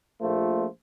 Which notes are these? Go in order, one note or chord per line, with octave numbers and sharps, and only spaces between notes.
A#1 A#2 A3 F4 C5